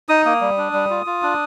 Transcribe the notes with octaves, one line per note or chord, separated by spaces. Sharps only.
D#4 D#6
A#3 D#6
G3
D4
G3
F4
F4
D4